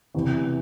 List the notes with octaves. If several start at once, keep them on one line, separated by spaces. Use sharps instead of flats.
E2 C3 E3